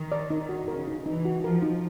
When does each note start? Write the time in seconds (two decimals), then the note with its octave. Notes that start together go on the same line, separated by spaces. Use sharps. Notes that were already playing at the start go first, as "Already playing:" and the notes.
Already playing: D#3
0.12 D5
0.30 D#4
0.49 F#4
0.68 C#3 A#4
0.88 D#4
1.06 E3 D#4
1.25 F#4
1.44 F3 A#4
1.62 D#4